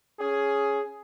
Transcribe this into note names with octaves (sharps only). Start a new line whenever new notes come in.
C#4 G#4